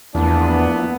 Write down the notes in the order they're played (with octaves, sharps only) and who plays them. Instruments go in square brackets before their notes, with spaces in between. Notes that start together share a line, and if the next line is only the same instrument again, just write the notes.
[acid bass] E2 [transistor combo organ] F3 A#3 E4 [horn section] B3 [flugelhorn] D4